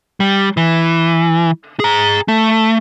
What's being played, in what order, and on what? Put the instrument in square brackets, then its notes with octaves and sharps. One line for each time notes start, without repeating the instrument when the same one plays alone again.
[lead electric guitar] G3
E3
G#4 A#5
A3